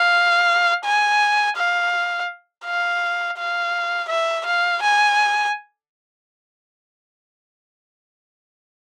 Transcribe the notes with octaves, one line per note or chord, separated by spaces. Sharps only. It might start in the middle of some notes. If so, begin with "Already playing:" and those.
Already playing: F5
G#5
F5
F5
F5
E5
F5
G#5